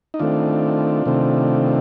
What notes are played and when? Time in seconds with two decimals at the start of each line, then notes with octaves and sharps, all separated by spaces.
0.14 D#4
0.19 D#3 A3 C4 D4 F4
1.06 C3 D#3 A3 C4